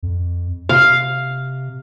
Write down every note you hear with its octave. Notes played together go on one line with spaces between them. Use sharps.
F2
C3 F5